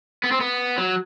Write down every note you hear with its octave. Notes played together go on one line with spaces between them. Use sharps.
B3
C4
B3
F#3